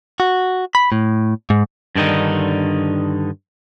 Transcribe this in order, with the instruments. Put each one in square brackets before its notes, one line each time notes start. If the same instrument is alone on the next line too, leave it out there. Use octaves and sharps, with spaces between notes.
[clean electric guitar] F#4
B5
A2
G#2
G2 D3 D#3 D#4